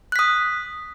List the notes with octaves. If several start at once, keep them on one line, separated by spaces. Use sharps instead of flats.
D#6 F#6 B6